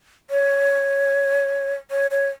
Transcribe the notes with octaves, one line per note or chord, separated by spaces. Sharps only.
C#5
C#5
C#5